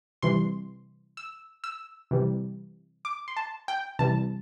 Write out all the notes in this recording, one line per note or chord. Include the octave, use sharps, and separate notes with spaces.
C3 E3 G3 C6
E6
E6
C3 E3 G3
D6
C6
A5
G5
C3 E3 G3 A5